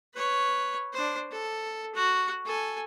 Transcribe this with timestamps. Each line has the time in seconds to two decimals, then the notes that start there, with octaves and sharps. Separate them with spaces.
0.14 B4 C#5
0.93 D4 C5
1.32 A4
1.95 F#4
2.45 A4 G#5